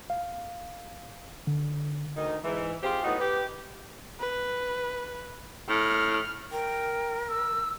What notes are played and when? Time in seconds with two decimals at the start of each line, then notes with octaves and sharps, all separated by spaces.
0.10 F5
1.47 D3
2.16 D2 D#3 D#4
2.44 G#2 E3
2.83 C4 F4 G4 G#4 C5
3.04 A2 B3 D#4 F#4
3.20 G4 B4
4.20 B4
5.69 A2 F6
6.52 A#4 G5
7.30 E6